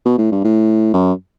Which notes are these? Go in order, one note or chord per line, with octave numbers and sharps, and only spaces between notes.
B2
A2
G2
A2
F#2